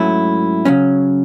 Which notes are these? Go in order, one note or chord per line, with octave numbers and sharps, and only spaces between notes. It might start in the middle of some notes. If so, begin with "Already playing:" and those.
Already playing: G#2 F#3 A3 C#4 E4
C#3 F#3 C#4